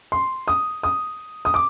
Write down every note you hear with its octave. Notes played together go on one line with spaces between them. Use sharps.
C6
D#6
D#6
D#6
D6